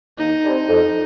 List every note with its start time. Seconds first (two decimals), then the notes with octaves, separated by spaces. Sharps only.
0.18 D#2 D#4
0.43 D3 G3 C4
0.69 F2